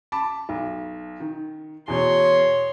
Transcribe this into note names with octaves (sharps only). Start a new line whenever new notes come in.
A5 B5 D6
B1
D#3
E2 B2 C#5 C6